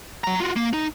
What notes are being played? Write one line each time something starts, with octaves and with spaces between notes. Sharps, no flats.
F#3 A#5
F4 F#4
A#3
D#4